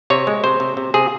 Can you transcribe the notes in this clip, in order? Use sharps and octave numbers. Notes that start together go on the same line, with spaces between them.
C3 C#5
G#3
C3 C5
C3
C3
C3 G#4